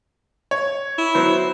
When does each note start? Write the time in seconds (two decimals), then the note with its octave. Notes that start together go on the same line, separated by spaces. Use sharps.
0.51 C#5
0.98 E4
1.15 F#3 B3 C5